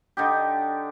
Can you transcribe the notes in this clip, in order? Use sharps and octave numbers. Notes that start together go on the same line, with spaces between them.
D3 D#4 G4